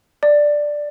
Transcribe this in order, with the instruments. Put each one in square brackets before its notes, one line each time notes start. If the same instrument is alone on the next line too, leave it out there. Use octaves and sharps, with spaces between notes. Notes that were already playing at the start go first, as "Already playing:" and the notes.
[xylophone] D5